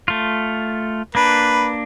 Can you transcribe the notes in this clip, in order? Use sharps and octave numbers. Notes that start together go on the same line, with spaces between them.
A3 F4
A#3 D4 B4